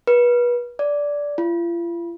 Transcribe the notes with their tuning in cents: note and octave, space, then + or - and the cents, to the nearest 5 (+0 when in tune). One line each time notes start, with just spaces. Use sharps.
B4 -30
D5 -10
F4 -40